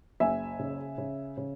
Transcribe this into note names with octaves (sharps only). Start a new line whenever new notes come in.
F#1 E5 G#5
C#3
C#3
C#3